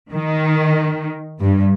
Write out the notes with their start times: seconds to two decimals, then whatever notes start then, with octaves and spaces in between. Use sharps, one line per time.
0.12 D#3
1.40 G2